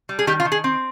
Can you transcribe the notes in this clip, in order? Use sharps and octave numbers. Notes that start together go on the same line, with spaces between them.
G3
G#4
D#3 G4
F4
D#3
G#4
C4